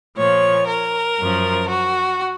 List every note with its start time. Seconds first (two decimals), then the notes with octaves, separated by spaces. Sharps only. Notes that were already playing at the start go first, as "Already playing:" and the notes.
0.17 A#2 F3 C#5
0.67 A#4
1.18 F#2 F3
1.69 F#4